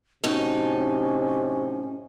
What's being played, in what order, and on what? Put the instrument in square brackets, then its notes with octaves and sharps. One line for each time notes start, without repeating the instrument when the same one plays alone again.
[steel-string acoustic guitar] F#2 A2 D#4 [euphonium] C3 [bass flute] C#4